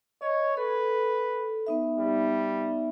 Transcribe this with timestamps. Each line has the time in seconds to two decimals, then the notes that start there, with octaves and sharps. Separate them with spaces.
0.22 C#5 D#5
0.57 A4 B4
1.67 B3 D#4 E5
1.98 G3